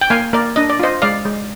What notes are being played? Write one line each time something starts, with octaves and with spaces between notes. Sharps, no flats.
G5
A#3 F5 G#5
A#3 A#4 D5
D4 D#5
D5
F4 C5 D#5
G#3 D5 F5
G#3